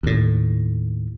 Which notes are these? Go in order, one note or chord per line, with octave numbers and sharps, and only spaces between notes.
D#2 A2